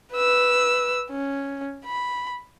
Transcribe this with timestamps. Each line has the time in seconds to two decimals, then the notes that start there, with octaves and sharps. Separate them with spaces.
0.13 B4 E6
1.10 C#4
1.85 B5